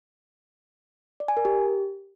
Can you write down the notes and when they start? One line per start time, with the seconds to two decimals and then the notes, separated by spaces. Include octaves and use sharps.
1.20 D5
1.28 G#5
1.37 A#4
1.45 G4